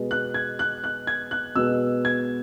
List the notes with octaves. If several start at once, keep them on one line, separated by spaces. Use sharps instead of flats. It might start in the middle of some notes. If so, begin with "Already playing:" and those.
Already playing: B2 G#3 B3
F#6
G#6
F#6
F#6
G#6
F#6
B2 G#3 B3 E6
G#6